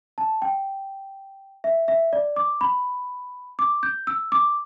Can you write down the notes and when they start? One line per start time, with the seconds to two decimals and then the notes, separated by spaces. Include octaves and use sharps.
0.18 A5
0.42 G5
1.64 E5
1.88 E5
2.13 D5
2.36 D6
2.61 B5
3.59 D6
3.83 G6
4.07 E6
4.32 D6